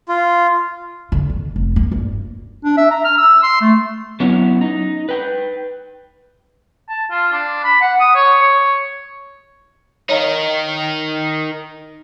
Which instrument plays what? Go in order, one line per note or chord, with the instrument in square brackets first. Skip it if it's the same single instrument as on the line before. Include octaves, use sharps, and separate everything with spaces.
[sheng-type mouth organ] F4
[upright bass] D3
D#3
F1
A#3
G2
[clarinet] D4
E5
A#5
F6
E6
C6
A3
[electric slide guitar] F#3 B3 C#4 E4
D#4
B4 G5
[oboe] A5
F4
D4
B5
F#5
D#6
C#5
C#5
[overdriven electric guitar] D#4 A#4 [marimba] C#5 D#5 F5